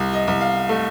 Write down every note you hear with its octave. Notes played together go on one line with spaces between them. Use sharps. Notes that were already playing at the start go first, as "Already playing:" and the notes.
Already playing: C2
D#5
C2
F5
A3